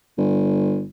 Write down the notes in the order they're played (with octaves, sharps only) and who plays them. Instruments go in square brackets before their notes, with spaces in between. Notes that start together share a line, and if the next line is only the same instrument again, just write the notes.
[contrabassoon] G1